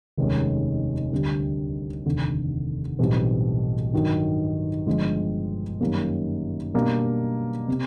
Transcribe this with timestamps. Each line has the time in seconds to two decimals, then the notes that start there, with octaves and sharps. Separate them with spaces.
0.17 F1 D#2 D#3 G#3 C#4
1.12 D2 D3 G3
2.06 F1 D#2 D3
2.99 B1 A2 E3 G3 C4
3.93 G2 D#3 F#3
4.87 G1 G2 D3 F3 G#3
5.80 F#2 D#3 G3 A#3 C#4
6.74 B2 G3 A#3 D4
7.68 C3